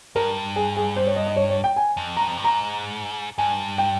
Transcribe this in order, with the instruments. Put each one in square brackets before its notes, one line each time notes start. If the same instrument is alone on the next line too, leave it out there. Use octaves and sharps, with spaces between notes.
[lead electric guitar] G2 [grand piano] A#4
[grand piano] G#4
G#4
C5
C#5
D#5
D#5
C#5
C#5
G5
G#5
[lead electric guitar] F2
[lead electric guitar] G2 [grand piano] A#5
[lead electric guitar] F2
G2
[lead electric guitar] G#2 [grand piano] A#5
[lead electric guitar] G2 [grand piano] G#5
[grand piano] G5